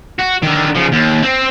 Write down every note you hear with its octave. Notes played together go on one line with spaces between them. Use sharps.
F#4
D3 D#3
C#3 F3
D#2
C4